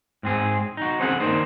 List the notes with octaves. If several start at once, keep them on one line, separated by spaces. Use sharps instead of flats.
G#2 C4 G#4
D#4 F#4
C4 C#4 G#4 A4 F#5
D#3 A#3 D4 D#4 C5